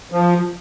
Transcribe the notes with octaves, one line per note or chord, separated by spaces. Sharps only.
F3